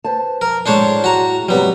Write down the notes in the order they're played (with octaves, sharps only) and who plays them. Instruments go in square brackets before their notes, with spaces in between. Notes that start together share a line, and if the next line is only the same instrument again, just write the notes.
[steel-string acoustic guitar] B4 C5 A5
[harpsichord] A#4
[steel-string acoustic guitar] E2 A2 G#3 [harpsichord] D4 C5 C#5
[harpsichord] F#4 A#5
[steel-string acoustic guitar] G#2 C3 F#3 [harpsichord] G3 B3